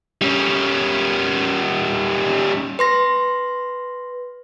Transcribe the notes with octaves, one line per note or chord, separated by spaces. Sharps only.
G3 C#4
B4 C6 A#6